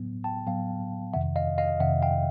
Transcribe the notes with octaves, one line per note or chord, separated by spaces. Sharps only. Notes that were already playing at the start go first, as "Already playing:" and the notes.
Already playing: A2 F#3 B3
G5 A5
A2 F#3 B3 F5 G5
F2 C3 D#3 E5 F#5
D#5 F5
D#5 F5
F2 C3 D#3 E5 F#5
F5 G5